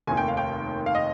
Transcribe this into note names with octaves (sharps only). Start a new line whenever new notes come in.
F1 D#2 D#3 G#5
G5
F5
G5
F5
D#5